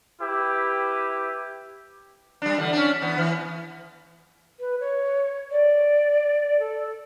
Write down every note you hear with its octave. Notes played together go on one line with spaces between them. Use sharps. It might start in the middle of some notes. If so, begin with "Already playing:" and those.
E4 G4 B4
G3 D4
D3 E3
C#4 D4
E2 B3
E3
B4
C#5
D5
A4